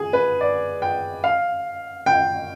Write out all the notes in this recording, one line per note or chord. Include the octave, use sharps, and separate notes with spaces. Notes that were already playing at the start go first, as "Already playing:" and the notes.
Already playing: G#4
B4
D5
G5
F5
G5